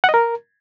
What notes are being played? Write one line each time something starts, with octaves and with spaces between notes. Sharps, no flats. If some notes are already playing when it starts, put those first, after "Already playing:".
F#5
D#5
A#4